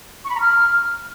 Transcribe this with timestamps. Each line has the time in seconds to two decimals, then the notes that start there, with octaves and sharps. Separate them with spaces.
0.24 C#6
0.29 B5
0.35 A#5
0.40 F6